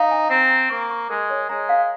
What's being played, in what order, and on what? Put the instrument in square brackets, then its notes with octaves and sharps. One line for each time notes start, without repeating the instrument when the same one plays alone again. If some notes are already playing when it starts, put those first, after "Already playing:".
Already playing: [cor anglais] D#4 [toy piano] F5
[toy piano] G#5
[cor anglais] C4 [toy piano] A#5
[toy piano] A#5
[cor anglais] A#3 [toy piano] C#6
[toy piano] C#6
[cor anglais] G#3 [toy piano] A#4
[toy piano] C#5
[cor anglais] G#3 [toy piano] A#5
[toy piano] F5